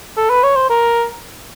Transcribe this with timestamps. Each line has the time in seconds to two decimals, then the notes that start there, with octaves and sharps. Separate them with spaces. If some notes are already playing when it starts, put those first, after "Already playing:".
0.17 A4
0.30 B4
0.43 C#5
0.56 C5
0.69 A#4